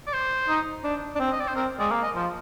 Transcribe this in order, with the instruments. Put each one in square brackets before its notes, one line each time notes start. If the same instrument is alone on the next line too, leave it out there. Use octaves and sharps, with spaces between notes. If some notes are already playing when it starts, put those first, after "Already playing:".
[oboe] D5
C5
[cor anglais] D#4
D4
D4
C4
[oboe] D#5
D5
C5
[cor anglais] C4 [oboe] A#4
[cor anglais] G#3 [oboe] D5
[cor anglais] A#3
[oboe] D#5
[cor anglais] F3